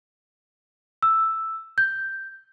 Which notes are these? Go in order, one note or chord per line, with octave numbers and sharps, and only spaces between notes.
E6
G6